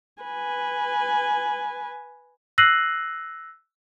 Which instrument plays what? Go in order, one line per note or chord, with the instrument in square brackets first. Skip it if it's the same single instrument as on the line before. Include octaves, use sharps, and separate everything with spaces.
[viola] B4 G#5
[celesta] E6 F#6 A#6 C7 D#7 F#7